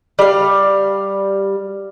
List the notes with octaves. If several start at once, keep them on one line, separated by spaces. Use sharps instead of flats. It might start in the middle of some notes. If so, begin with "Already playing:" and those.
G3 F5